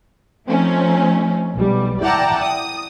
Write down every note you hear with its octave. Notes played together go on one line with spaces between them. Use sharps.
F3 A3 C4 C#4 D#4
B1 G3
E4 D5 F#5 G5 A5 A#5
D#6